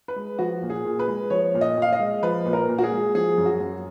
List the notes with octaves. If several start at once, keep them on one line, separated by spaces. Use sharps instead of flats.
B4
G#3
F3 F#4
A#2
G#4
A#2
B4
G#3
F3 C#5
A#2
D#5
A#2
F5
D#5
G#3
F3 B4
A#2
A#4
A#2
F#4
G#4
G#3
F3 G#4
F#2
F#4
F#2